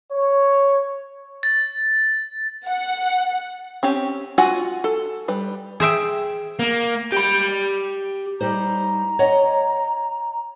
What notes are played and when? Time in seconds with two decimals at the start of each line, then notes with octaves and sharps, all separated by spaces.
0.13 C#5
1.43 A6
2.66 F#5
3.83 C4 C#4 G4
4.38 F4 F#4 F#5 G#5
4.84 A4
5.28 G3 B4
5.80 G#4 C5 E5 G5
6.59 A#3
7.12 G4 B5
8.41 G3 D#4 C5 A#5
9.19 C#5 D#5 F#5